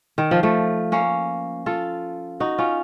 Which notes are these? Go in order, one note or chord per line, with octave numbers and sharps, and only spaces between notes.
D#3
F3
F3 A3
A#3 C#4
F4 A4
D#4 F#4
C#4 F4